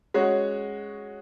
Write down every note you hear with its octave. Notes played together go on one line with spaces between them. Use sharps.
G#3 C#4 F#4 C#5